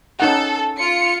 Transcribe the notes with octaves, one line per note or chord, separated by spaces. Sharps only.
C#4 D#4 A4 F#5
F4 C#7